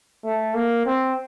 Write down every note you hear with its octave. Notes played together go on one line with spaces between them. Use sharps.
A3
A#3
C4